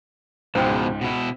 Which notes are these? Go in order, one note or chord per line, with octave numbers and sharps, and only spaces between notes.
C#2 G#2 B2 F3 C5 G5
B2 E4